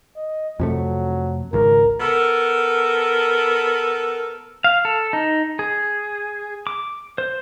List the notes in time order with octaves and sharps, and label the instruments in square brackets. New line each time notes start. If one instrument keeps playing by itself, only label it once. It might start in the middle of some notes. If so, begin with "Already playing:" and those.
[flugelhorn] D#5
[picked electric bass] F2 C3 A3 [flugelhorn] F#3
[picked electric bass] G#1 C#2 [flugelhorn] A#4
[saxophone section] B3 A4 A#4
[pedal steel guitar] F5
A4
D#4
G#4
D6
C5